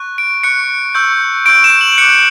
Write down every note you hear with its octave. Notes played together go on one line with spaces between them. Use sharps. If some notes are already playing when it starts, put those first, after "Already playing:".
Already playing: C#6 F#6
D7
C#6 F#6 C#7
C#6 E6 G6
C#6 E6 G6 D7
E7
F#7
D6 F#6 C#7